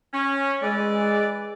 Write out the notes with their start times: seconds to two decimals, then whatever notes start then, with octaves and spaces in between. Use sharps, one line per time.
0.13 C#4
0.63 E3 G#3 B4 D5